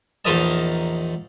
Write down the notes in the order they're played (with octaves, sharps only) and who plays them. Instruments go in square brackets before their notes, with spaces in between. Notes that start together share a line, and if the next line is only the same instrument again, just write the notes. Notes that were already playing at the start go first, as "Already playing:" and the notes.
[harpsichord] A#1 E2 D#4 A#4 D#5 A5